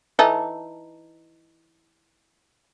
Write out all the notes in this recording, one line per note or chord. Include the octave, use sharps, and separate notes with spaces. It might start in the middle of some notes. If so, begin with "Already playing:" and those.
E3 D#4 A4